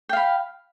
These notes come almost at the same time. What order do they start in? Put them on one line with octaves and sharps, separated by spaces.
G5 F5 B5